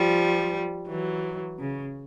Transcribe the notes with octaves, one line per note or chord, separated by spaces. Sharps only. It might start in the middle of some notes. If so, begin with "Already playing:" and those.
Already playing: F3 G3
E3 F#3
C#3